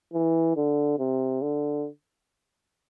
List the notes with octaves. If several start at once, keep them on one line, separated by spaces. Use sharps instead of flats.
E3
D3
C3
D3